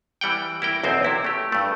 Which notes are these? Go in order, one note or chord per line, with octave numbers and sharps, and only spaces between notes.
E3 G3 F#5 G5
E4 A#4 G5
B1 E2 C4 D#4 C5
C3 E4 A#4
A3 G4
G2 A3